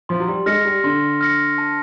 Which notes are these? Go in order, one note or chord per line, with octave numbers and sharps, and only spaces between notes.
F3 C6
F#3
G3
G#3 F6 A#6 C#7
G3
D3 C6
F6 A#6 C#7
A5